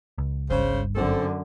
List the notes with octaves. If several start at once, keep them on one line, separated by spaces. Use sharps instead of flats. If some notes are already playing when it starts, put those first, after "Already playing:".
C#2
G1 G2 C#3 C5
F#2 D3 C4 A4